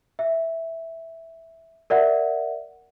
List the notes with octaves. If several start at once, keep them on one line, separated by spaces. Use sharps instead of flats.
E5
A#4 D5 E5 F#5